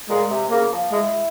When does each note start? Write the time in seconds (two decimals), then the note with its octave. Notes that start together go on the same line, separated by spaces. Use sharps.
0.09 A#2 G#3
0.30 C3
0.51 C#3 A#3
0.72 F3
0.92 G#3 E4